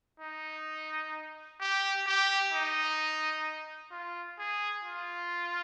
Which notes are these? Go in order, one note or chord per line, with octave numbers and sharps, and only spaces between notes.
D#4
G4
G4
D#4
F4
G#4
F4